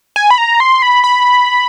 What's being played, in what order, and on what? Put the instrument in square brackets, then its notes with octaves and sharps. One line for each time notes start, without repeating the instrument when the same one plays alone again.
[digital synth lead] G#5
B5
A#5
C6
B5
B5